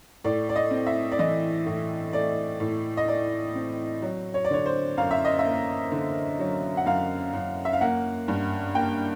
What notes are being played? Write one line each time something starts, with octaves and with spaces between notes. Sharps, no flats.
A2 D5
D5
D#5
C4
E5
D5
E3 D#5
A2
A3 D5
A2
D#5
A3 D5
C4
F#3
C#5
D5
D3 C#5
C5
F#2 F5
E5
D#5
E5
A#3
D3
F#3
F#5
F#2 F5
F#2
E5
F5
A#3 F#5
G2
A#3 G5